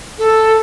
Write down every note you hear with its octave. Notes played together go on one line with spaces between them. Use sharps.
A4